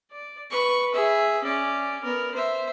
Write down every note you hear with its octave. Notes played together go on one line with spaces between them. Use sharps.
D5
B4 C#6
G#4 E5
C#4 D5
B3 A#4
C5 E5